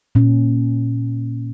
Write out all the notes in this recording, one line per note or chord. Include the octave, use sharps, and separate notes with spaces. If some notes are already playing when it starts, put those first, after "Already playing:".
A#2 C#4